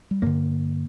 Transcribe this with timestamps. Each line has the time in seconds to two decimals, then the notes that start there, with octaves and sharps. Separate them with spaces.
0.11 G3
0.22 G2 D3 A#3